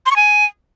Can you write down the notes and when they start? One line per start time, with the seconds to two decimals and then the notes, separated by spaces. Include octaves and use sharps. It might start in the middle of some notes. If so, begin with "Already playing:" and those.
0.06 C6
0.11 C#6
0.16 G#5